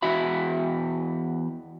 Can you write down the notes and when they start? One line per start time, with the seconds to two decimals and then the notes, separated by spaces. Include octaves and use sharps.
0.02 E2 E4 F#4 E5 B5